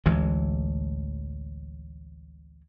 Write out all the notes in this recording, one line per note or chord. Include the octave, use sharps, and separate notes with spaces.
A1 D2 E3 G#3